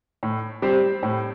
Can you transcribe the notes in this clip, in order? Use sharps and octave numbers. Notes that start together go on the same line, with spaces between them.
A2
G3 C4 G4 C5
A2